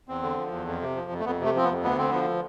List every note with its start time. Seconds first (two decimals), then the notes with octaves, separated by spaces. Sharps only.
0.08 E2 C4
0.22 D3
0.37 F3
0.52 E2
0.66 F2
0.81 C3
0.96 F3
1.11 F2
1.20 A3
1.25 F2 B3
1.40 C3 A3
1.55 F3 C4
1.65 B3
1.69 F2
1.83 D2 B3
1.97 D3 C4
2.10 F3 B3